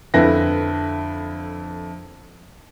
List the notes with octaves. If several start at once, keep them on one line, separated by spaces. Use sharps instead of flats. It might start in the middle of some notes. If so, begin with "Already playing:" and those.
F2 D3 E4 B4 A#6